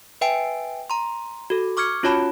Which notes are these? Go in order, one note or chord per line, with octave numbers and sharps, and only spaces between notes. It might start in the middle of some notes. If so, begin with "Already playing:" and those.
B4 E5 G5 G#5 D7
A#5 C6
F#4 A4
C#6 D6 F6 G#6 C#7
C#4 F4 F#4 C#5 A5 B5